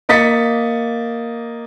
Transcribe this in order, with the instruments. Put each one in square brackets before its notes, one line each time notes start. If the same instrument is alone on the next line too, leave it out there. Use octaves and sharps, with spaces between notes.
[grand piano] A#3 D#5 A6 B6 C#7